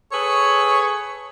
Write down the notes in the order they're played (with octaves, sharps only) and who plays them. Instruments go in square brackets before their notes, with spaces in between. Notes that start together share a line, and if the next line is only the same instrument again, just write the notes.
[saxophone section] G#4 A4 B4 [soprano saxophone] C#5